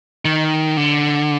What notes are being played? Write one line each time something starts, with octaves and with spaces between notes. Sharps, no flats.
D#3
D3